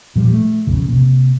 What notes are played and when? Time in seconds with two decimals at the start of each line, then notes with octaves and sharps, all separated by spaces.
0.16 A#2 F3 G3
0.32 A3
0.67 B1 F2 C#3
0.88 C3 A#3